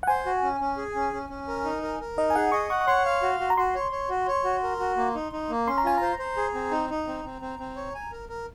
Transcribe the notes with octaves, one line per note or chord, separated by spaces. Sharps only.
F#5
C5 G#5
F#4
C#4
C#4
G#4
C#4
C#4
C#4
A#4
D#4
A#4
A#4
D#4 D#5
G#5
G#4 F#5
D#5 C#6
F#5 C#6
C#6
C#5 C6
F5
F#4
F#4
A#5
F#4 C6
C#5
C#5
F#4
C#5
F#4
A#4
F#4
A#3
D#4
D#4
A#3
C#4 C6
A#5
F4 G#5
C5 A#5
C5
G#4
C4
D#4
D#4
C4
C4
C4
C4
C#5
G#5
A#4
A#4